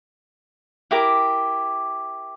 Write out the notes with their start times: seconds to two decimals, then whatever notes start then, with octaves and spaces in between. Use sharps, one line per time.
0.91 E4 G4 A#4 D6